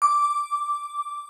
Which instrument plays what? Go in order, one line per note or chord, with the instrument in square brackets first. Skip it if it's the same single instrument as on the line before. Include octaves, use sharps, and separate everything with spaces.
[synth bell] D6